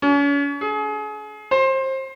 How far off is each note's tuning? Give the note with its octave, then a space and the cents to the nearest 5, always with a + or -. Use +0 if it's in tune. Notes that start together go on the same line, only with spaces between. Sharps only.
C#4 +40
G#4 +35
C5 +25